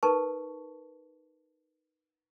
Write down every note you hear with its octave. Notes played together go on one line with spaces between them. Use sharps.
D#4 A#4 B4 A5 C#6